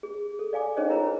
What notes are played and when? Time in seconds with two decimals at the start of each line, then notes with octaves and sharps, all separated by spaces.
0.03 G#4
0.39 A4
0.53 D5 F5 G#5 D6
0.77 C#4 D#4 G#4 C5 C#5 D#5
0.89 E4 F4 A#4 C#5 A#5 B5